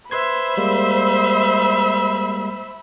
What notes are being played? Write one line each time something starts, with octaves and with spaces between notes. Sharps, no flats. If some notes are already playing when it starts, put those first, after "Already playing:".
B4 C5 E5 B5 C6 G#6
G3 G#3 A#3